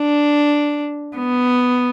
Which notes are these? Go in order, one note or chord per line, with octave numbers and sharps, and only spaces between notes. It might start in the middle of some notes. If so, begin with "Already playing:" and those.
Already playing: D4
B3